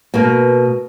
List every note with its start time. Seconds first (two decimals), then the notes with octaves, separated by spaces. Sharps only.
0.14 B2 A#3